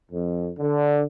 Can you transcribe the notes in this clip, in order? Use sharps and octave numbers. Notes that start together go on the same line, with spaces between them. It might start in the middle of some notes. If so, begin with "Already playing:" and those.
F2
D3